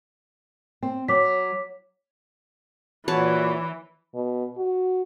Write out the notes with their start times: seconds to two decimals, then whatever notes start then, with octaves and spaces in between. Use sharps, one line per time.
0.83 C4
1.08 F#3 C#5 D6 B6
3.08 A#2 E3 F#4 B4 C#5 A5
4.14 B2
4.57 F#4